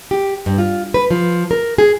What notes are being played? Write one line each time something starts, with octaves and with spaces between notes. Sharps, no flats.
G4
G2
F4
B4
F3
A#4
G#4